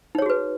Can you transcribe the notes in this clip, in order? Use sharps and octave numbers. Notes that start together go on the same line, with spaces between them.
D#4 F#4 G#4 B4 C#5